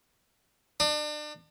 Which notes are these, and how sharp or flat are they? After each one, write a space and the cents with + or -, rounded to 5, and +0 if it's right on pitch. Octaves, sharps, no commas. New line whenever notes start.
D4 +35